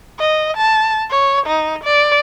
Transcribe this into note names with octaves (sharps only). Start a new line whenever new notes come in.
D#5
A5
C#5
D#4
D5